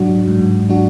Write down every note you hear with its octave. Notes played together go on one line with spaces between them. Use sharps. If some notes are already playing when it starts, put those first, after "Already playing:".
Already playing: G#2 F#3 D4 F#4
G#2
F#3 D4 F#4